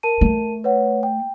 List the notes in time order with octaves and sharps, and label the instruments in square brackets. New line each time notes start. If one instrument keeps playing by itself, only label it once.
[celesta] A#4 A5 D#7
[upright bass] A3
[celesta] B4 C#5 F#5
G5